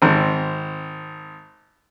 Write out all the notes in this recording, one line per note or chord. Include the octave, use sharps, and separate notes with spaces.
G#1 C4